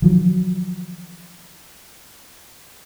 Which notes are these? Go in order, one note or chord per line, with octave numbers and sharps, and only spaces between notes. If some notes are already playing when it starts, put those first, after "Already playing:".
D#3 F3 F#3